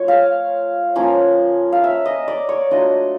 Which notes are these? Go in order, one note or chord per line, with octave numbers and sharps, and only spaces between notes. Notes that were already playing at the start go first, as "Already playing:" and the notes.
Already playing: F3 A3 F4 C#5
F5
F3 A#3 C#4
F5
E5
D#5
D5
C#5
F#3 A3 D4 F4 D#5